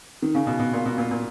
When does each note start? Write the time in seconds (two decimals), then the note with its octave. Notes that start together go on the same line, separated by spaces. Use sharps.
0.22 D#3
0.35 C#3
0.47 B2
0.59 B2
0.73 A#2
0.86 B2
0.98 A#2
1.11 A#2